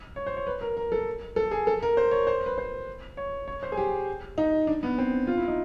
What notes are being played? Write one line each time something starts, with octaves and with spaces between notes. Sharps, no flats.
C#5
C5
C#5
B4
A#4
A#4
A4
A4
G#4
A4
A#4
C5
C#5
C5
B4
C5
C#5
C#5
C5
G#4
G4
D#4
D4
B3
C4
F4
E4
D#4